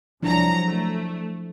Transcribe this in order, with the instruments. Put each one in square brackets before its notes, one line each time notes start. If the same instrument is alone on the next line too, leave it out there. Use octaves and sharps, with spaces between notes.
[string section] C2 F#3 A#5 [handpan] F3 D4 E4
[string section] A3